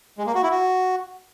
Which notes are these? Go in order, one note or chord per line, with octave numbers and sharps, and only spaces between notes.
G#3
A#3
F#4
E4
F#4